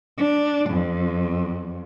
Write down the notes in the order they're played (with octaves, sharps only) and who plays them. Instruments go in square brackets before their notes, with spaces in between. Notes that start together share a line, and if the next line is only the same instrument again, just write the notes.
[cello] D4
F2